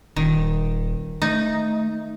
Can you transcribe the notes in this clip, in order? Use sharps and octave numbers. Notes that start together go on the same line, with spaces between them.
D#1 D#3
A3 D#4